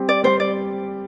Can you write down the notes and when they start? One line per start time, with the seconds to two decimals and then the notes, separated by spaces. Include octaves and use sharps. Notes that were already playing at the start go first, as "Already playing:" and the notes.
Already playing: G3 C4 G4
0.09 D5
0.23 G3 C4 G4 C5
0.40 D5